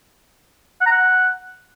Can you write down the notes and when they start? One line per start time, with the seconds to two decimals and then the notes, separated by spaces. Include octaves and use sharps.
0.81 F#5
0.86 A#5
0.91 F#5